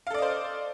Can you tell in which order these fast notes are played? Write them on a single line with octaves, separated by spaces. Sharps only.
F5 A4 D5 D#5 C5